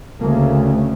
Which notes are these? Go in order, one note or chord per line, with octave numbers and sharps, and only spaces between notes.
D2 C#3 A#3